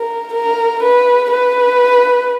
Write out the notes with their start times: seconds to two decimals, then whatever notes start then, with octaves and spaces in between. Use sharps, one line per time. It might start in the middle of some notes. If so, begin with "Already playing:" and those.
Already playing: A#4
0.33 A#4
0.82 B4
1.31 B4